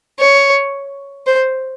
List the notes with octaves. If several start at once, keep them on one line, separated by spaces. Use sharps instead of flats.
C#5
C5